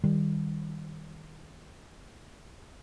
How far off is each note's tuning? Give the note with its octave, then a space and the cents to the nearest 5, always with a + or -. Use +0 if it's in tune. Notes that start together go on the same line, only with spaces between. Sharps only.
D#3 +0 G3 +0